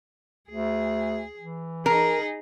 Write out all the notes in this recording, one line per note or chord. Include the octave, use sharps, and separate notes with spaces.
D2 G#4
E3
D#4 G#4 A#4